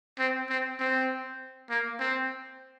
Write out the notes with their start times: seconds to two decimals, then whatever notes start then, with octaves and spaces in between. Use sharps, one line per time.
0.19 C4
0.49 C4
0.80 C4
1.70 A#3
1.99 C4